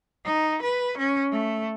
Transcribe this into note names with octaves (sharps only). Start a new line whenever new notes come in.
D#4
B4
C#4
A3